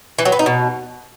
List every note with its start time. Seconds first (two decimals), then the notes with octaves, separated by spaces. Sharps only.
0.19 E3
0.25 F#3
0.32 B3
0.39 D#4
0.46 B2